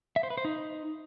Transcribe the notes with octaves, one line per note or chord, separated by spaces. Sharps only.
E5
C5
B4
C5
D#4